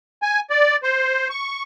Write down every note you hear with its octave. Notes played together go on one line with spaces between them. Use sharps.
G#5
D5
C5
C#6